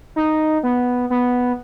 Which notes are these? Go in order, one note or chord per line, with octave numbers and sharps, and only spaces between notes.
D#4
B3
B3